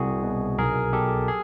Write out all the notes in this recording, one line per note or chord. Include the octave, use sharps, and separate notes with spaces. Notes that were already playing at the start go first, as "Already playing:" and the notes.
Already playing: C2 F#4 G#4
B2
B1 G#4 A#4
B2 G4 A4
G#4